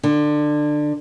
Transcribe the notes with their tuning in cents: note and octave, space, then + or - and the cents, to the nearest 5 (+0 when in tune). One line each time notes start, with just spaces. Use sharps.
D3 +20